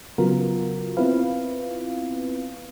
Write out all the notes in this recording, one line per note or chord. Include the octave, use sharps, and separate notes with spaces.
C#3 F#3 B3 F4 F#4 A#4
B3 C4 E4 F4 B4 F5